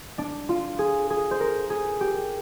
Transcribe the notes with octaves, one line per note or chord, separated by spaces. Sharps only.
D4
F4
G#4
G#4
C5
A#4
G#4
G4